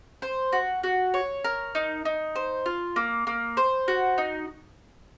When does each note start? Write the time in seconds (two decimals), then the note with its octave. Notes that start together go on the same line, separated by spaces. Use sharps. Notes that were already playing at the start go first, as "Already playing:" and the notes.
0.22 C5
0.53 F#4
0.83 F#4
1.14 C#5
1.44 A#4
1.75 D#4
2.05 D#4
2.36 C5
2.66 F4
2.96 A#3
3.27 A#3
3.57 C5
3.88 F#4
4.18 D#4